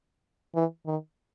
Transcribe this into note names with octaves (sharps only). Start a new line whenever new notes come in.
E3
D#3